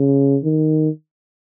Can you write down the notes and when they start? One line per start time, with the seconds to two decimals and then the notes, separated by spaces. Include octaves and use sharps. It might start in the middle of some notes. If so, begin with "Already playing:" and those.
Already playing: C#3
0.44 D#3